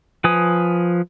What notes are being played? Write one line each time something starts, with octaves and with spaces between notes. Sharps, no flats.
F3 B4 G#5 D#6